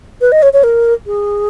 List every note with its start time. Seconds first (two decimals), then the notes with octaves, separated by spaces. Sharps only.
0.21 B4
0.32 D#5
0.42 C#5
0.53 C#5
0.64 A#4
1.07 G#4